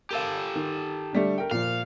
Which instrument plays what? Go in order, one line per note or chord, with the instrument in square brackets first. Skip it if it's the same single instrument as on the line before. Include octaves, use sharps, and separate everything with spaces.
[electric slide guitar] G4 A4 [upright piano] A#4 F5
[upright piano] D#3
D3 G3 A3
A#4 G5
[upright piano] A#2 F3 [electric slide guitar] F5